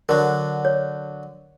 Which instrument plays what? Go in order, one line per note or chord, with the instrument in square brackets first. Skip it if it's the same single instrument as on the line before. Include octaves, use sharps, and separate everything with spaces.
[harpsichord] D3 F#3 [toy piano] A#4
[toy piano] C#5